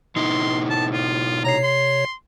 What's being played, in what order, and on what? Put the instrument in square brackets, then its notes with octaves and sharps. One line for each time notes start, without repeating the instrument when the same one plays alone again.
[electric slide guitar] B2 D#4 E4 [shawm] C6
[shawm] A5
F4
[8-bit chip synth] C3 C#5 C7 [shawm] A#5
[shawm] C6